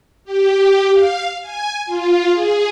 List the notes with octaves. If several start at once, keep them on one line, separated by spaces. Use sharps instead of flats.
G4
F5
G#5
F4
G#4